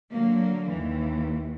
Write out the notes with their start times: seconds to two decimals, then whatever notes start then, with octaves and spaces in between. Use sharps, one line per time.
0.11 D3 F#3 A#3
0.69 D#2 E3